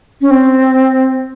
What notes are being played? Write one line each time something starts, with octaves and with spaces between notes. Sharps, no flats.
C#4
C4